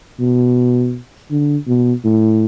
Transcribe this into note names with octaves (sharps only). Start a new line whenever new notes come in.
B2
D3
B2
A2